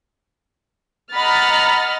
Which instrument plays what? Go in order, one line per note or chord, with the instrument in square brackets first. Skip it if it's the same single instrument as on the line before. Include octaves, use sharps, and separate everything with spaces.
[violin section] D#5 F#5 A#5 B5 F6 A6